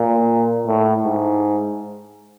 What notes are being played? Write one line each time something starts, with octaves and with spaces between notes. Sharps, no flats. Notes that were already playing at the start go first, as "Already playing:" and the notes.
Already playing: A#2
A2
G#2